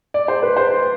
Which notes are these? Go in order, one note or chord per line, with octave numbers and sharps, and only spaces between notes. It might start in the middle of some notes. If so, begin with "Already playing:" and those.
D5
C5
B4
C5